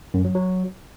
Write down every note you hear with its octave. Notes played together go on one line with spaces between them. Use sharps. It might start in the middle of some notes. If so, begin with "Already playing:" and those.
F#2
F#3
F#3